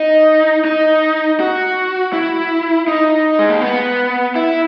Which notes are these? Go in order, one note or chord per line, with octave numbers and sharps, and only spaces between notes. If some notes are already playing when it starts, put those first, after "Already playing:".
Already playing: D#4
D#4
F#4
E4
D#4
G#3
A#3
B3
E4